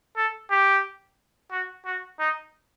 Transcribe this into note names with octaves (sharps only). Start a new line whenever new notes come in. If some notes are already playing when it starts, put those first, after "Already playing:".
A4
G4
F#4
F#4
D#4